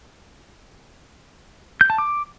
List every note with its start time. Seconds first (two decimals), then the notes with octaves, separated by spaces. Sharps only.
1.81 G6
1.90 A5
1.98 D6